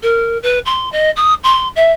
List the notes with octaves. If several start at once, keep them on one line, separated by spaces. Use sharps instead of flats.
A#4
B4
C6
D#5
D#6
C6
E5